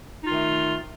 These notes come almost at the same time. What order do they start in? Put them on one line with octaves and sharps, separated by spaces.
D#4 F4 D#3 A3